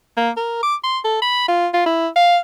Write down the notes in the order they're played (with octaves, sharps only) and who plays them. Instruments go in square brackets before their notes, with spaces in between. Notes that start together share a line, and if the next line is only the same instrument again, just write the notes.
[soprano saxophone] A#3
A#4
D6
C6
A4
B5
F4
F4
E4
F5